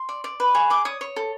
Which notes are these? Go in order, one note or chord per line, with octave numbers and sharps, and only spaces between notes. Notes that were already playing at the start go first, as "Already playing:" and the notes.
Already playing: C6
D5
D5
B4
G#4 C#6
D5 D6
C#5 D#6
C#5
A4